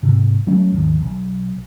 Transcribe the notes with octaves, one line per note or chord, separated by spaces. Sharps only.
G#2 C3
F#3 A3 C#4
D#1 G#1 D#2 F3
B1